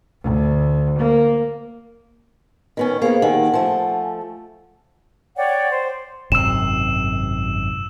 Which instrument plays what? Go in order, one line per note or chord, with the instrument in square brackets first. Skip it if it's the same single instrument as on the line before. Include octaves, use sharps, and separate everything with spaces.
[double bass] D2
A#3
[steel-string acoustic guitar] D#3 B3 C#4
[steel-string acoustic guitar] A#3 B3 [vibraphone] G#4 C5 F5
[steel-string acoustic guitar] D#2 D#3 [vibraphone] F#5 G#5
[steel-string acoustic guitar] F3 A3
[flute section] C#5 D5 F#5 G5
C5
[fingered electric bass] G#1 F#2 C3 [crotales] E6 E7